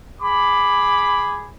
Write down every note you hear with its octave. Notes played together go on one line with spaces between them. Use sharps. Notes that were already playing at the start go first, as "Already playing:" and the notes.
G#4 B5 D6